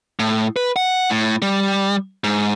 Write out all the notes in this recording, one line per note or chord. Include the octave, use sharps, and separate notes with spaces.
A2
B4
F#5
A2
G3
G#2